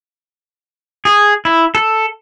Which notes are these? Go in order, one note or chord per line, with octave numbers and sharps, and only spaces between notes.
G#4
E4
A4